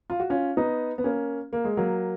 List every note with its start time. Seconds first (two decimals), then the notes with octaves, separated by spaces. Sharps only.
0.10 F4
0.20 F#4
0.30 C#4 F4
0.57 B3 D#4
0.98 B3
1.04 A#3 C#4
1.53 A#3
1.64 G#3
1.77 F#3 A#3